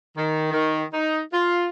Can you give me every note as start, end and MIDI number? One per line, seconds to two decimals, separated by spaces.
0.17 0.51 51
0.52 0.82 51
0.94 1.19 63
1.33 1.67 65